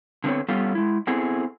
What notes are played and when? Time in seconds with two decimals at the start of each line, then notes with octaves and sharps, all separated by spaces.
0.24 D3 B3 C4 A4 C#5
0.49 G3 B3 C#4 F4 G4 A4
0.75 G#3 E4
1.07 B3 C4 E4 G#4 A4